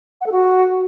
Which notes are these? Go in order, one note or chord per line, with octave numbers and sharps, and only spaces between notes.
F#5
A4
F#4